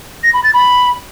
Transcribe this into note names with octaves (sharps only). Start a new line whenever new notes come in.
A#6
B5
A6
B5